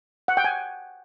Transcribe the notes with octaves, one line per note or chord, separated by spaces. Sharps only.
F#5
G5
G#5